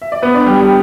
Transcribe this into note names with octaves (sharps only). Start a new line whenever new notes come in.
E5
D5
B3 B4
D4 D5
G3 G4
G3 G4